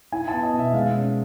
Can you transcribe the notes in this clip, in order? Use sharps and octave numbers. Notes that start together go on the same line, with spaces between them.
E4 G#5
B3 A5
D#5
B2
E5
G#3 F5
C#4